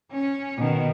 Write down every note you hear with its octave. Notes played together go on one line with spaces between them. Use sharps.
C#4
B2 D#3